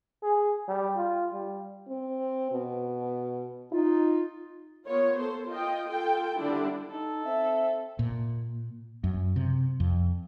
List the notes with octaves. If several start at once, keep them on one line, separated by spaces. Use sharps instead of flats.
G#4
G3
F4
G3
C4
B2
D#4 F4
A#3 B3 F4 C#5
A4 C5
F4 D#5 G5
F4 A4 G5
D3 G3 D4 E4
D#4 A4
C4 E5
A#2
F#2
C3
F2